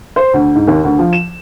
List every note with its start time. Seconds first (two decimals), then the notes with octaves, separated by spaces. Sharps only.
0.16 C5
0.33 D2
0.55 G#2
0.67 D#2
0.84 D2
0.99 F3
1.13 E7